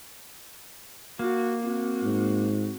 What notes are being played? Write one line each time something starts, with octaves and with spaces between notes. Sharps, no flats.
A#3 F#4
C4 F#4
G#2